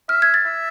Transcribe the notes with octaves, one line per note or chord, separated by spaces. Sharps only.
E5 F6
G#6
A6
E5